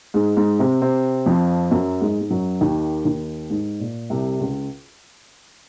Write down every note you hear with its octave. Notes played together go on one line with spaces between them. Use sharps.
G#2 G#3
G#2 G#3
C3 C4
C3 C4
F2 F3
F#2 F#3
G#2 G#3
G#3
F#2 F#3
D#2 D#3
D#2 D#3
G#2
A#2
C2 C3
C#2 C#3